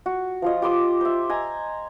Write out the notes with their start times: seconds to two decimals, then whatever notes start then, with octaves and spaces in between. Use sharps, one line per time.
0.06 F#4
0.42 F3 F4 D#5
0.62 G4 C6 D6 D#6
1.01 C5 E5
1.29 D#5 G#5 A#5